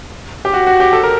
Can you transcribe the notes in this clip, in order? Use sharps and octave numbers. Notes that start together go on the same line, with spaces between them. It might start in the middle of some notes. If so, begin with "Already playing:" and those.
G4
F#4
F#4
G4
A4
A#4